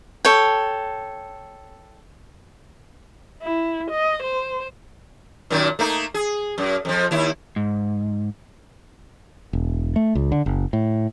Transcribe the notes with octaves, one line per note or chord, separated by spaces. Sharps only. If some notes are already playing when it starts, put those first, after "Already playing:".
A4 C#5 G5
E4
D#5
C5
F#2 A#2 D#3
A3 A#3 D#4
G#4
F#2
F2 F3
D#2 E4
G#2
E1
A3
C#2
D3
F#1
A2